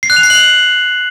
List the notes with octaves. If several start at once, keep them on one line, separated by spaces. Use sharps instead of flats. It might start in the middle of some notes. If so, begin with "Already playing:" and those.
C7
F#6
F7
C7
F#7